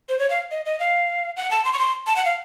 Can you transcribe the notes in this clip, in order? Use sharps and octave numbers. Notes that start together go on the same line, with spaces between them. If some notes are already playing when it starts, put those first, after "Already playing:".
C5
C#5
F5
D#5
D#5
F5
F#5
A5
C6
C#6
C6
A5
F#5
F5